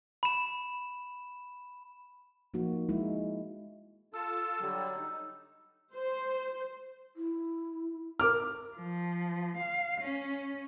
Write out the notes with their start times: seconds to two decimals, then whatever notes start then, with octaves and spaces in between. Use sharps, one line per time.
0.23 B5 E7
2.54 F3 A#3 D#4 F#4
2.89 G#3 D#4 E4
4.14 F4 A4 A5 E6
4.60 D3 F#3 G3
4.96 D#4
5.94 C5
7.16 E4
8.19 A#4 D6 F6
8.77 F3
9.57 F5
10.00 C#4